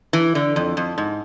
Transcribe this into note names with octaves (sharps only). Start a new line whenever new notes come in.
E3
D3
F2
F2
G#2